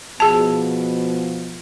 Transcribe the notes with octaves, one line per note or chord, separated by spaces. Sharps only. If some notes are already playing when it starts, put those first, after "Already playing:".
B2 F3 G#4 A5